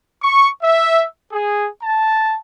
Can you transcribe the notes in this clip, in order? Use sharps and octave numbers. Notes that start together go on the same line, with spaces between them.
C#6
E5
G#4
A5